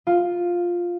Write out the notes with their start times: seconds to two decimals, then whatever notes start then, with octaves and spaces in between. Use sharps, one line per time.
0.07 F4